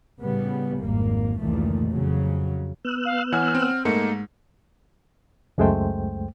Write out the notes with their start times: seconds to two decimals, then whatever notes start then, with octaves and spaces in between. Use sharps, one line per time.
0.20 A2 C#3 G3 B3
0.82 G#1 F2 A#3
1.39 F1 C#2 A#2 D#3 E3 A3
1.90 F2 C#3 F#3
2.85 B3 E6 F#6
3.05 F5
3.32 E3 C#5 F#5 G#5 F6
3.55 C4
3.85 G#2 A3 A#3 D#4 C#7
5.58 C#2 F#2 G#3 A3 C5 G5